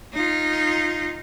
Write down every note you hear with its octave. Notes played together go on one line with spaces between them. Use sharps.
D#4 F4